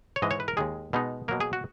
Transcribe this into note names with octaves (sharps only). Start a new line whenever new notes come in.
C#5
G#2 E3 G#3 D#5
C#5
B4
A#4
D#2 D#3 G#3 G#4
B2 G#3 B3 D#4
B2 F#3 A#3 A#4
G#4
F#4